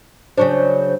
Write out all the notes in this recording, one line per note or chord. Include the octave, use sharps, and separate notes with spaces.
C#3 F#3 D4 C5